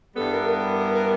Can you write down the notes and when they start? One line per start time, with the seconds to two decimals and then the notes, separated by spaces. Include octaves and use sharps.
0.15 G2 E3 G3 B3 A4
0.31 A#4
0.46 A#4
0.78 A#4
0.93 A#4